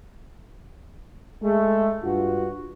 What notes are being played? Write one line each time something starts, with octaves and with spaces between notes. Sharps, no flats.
G#3 A3
G2 F4 F#4